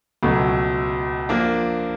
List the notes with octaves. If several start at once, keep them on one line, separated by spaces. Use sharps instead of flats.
C#2 B2 F#3 A3
F3 A#3 D4